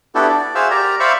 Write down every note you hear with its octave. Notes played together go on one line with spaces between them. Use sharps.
B3 D4 E4 F#4 G4 A4
D5
F#4 G#4 C5 E5 F5 E6
G4 A#4 D5 A#5
C5 D5 E5 F5 B5 C#6